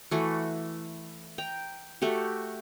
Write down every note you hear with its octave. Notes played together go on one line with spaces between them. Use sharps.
E3 A3 F#4
G5 A#5
A3 F#4 G4